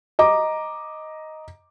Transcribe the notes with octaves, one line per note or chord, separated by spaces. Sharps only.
D#5 A#5 D6